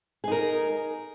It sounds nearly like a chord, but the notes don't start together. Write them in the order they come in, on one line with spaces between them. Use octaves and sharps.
G#4 D#4 A#4